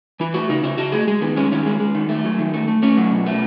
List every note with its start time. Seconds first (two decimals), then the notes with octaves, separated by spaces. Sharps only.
0.20 E3 E4
0.34 A3 F#4
0.49 C#3 D#4
0.63 C#3 E4
0.78 C#3 F#4
0.92 A3 G#4
1.08 G#3 G#4
1.21 D#3 B3
1.36 G#3 C#4
1.52 D#3 C#4
1.66 G#3
1.80 G#3
1.95 D#3
2.09 A3
2.24 F#3
2.39 D#3
2.54 A3
2.68 A3
2.83 A3 C#4
2.97 F#3
3.11 B2
3.26 A3